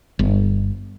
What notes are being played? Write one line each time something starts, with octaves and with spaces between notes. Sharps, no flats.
G1